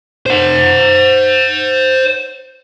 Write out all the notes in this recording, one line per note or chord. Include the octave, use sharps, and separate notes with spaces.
C5 F#5